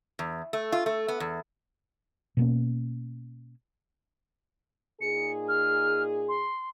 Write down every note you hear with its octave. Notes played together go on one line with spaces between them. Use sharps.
E2
A3
F4
A3
B3
E2
B2 A#3 C#4
A#2 D#4 G#4 C#7
F6
C6